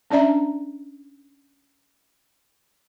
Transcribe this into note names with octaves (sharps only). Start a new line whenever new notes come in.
C#4 D4 D5 E5 A#5